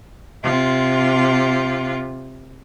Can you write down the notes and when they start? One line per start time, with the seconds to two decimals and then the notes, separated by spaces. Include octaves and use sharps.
0.43 C3 F4